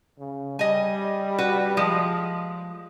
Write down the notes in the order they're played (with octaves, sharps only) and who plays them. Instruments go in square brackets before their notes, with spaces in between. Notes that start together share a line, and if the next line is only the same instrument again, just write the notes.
[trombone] C#3
[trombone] G3 [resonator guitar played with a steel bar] D#5 G#5
[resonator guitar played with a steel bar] F#4 B4
F3 G#3